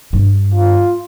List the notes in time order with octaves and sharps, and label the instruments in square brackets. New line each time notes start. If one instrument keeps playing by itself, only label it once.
[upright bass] G2
[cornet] F4